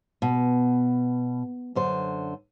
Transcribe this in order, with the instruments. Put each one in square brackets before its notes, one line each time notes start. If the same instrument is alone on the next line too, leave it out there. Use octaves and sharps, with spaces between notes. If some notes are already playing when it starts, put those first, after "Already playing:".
[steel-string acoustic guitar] B2
F#2 D3 C5